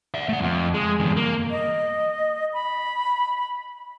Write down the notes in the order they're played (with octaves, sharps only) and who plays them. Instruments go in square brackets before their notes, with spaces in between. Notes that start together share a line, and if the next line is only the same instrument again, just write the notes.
[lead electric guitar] D5 E5
A3 F#5
F2
G#3
E2 G2
A#3
[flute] D#5
B5